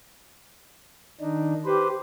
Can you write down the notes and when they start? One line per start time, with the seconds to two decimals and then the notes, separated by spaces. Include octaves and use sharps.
1.21 D#3 D4 D#4
1.65 G4 B4 C5